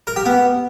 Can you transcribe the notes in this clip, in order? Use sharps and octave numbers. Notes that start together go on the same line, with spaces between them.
A#4
G4
B3